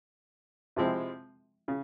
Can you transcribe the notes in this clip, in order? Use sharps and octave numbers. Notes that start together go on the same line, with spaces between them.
C3 F3 G#3 C4 E4
C#3